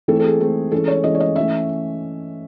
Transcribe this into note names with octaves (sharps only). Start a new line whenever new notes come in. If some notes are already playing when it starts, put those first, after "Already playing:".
E3 A3 C4 A4
A4
G#4
E3 A3 C4
E3 G#3 C#4 A4
C#5
E3 G#3 C#4 D#5
C#5
D#5
E3 A3 C#4 E5